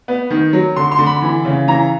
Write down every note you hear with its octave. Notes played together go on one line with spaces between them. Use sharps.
B3
D#3
F#3
D3 C6
C6
D3
B5
E3
C#3
E3 A#5